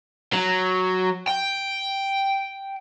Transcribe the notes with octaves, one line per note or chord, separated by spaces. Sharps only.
F#3
G5